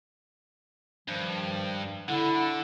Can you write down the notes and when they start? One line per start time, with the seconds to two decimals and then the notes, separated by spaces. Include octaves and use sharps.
1.08 G2 D#3 F3
2.08 D3 E4 A4 F#5